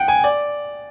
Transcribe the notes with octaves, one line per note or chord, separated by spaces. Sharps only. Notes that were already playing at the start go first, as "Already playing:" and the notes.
Already playing: F#5 G5
G#5
D5